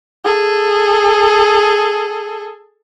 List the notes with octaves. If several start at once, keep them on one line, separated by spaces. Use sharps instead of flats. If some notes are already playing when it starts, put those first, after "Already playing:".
G#4 A4